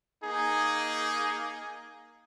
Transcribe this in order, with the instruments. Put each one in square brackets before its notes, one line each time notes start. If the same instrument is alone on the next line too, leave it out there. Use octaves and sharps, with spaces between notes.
[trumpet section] A#3 D#4 G#4